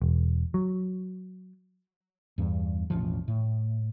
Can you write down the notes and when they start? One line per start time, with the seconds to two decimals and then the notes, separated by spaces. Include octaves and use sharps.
0.02 E1
0.54 F#3
2.38 E2 G2
2.90 E1 A1 F#2 F3
3.28 A2